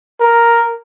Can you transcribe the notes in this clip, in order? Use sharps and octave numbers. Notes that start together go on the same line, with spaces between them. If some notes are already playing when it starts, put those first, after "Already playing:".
A#4